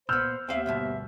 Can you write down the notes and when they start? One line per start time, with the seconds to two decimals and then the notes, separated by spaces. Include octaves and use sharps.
0.09 A#2 B3 C5 E6 F6 G6
0.49 D#2 B3 C4 E5 F5
0.66 D2 G2 B2